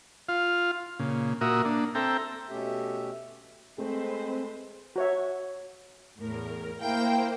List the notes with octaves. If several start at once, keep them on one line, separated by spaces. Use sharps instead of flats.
F4 F5
A#2 C#3
A#2 F#4 A#4 E5 D#6
A#3 D4
C4 A4 E5 G5 A#5
B2 A3 C#4 G4 E5
G#3 A3 C4 B4 C5
F#4 C#5 E5
E2 A2 A#4
A#3 E4 A#4 C5 F5 G5